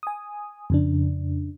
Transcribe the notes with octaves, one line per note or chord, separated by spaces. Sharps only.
G#5 D#6
F2 C#3 D4